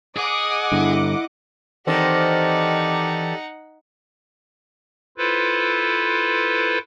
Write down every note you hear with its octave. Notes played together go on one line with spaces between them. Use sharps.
G#4 D#5 F#5 D6
G2 D3 E4
D#3 E3 C4 D#4 G4 A4 D5 F#5
E4 F4 A4 B4 C5